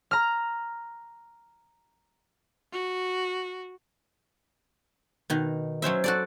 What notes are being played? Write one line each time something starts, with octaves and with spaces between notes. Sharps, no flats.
A#5 F6
F#4
B2 D#3
F#3 C#4 C5 E5
F#4 A4 D5